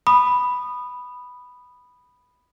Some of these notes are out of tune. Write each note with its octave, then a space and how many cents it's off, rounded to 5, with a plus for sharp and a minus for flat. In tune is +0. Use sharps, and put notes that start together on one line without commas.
B5 +0 D#6 -20